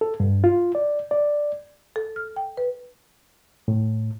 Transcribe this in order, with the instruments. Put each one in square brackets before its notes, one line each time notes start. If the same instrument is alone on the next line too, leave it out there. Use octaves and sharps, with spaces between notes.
[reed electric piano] A4
G2
F4
D5
D5
[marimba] A4
F6
G5
B4
[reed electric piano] A2